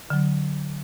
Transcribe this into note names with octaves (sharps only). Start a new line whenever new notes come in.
D3 F#3